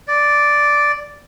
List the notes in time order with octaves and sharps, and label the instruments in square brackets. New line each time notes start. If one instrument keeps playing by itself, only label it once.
[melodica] D5